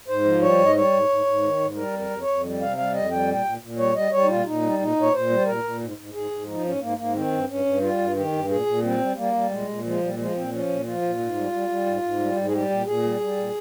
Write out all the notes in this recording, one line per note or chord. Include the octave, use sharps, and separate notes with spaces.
G#2 C5
F3
G3 C#5
G#2
D#5
G3 C#5
G#2
G#2
G#2
D#3
G#2
G3 A#4
F2
A#4
F2
C#5
F2
G3
C3 F5
G3 F5
F2 D#5
G3 G5
A#2
G5
A#2
A#2
G3 C#5
G3 D#5
G3 C#5
D#4
A#2 F4
A#2 D#4
G3
A#2 D#4
A#2
C#5
A#2 C5
G3
A#2 A#4
A#2
G#2
G#2
G#2 G#4
G#2
F3 D#4
G#2 C#4
G#2 A#3
G#2 A#3
D#3 C4
G2
G2 C#4
G2
G3 F4
G2
D#3 G4
G2
A#2 G#4
A#2
G3 C4
G3
G3 A#3
G3
A#2 G#3
A#2
F3 G#3
A#2 G3
F3 G#3
A#2 C4
F3 C#4
A#2
F3 F4
A#2
G#2
G3
G3
G3
G#2
G#2
G3
G#2
G#4
G3 G4
A#2
A#2 G#4
G3
G3
A#2